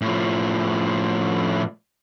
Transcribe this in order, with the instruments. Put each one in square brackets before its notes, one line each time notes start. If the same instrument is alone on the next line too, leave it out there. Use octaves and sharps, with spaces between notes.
[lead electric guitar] A2 F3